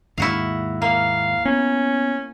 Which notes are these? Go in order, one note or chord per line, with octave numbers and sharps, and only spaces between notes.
D#2 G#2 E4 F#4 F5
A#3 F5
B3 C#4